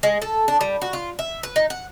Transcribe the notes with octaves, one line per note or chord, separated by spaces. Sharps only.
G#3
A4
D4
G3
F#4
F4
E5
B4
D#4
F#5